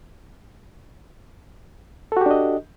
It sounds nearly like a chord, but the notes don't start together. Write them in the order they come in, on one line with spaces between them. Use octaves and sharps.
A4 F#4 G4 D4 D#5